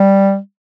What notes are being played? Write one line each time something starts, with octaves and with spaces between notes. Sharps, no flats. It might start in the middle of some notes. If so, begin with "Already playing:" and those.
Already playing: G3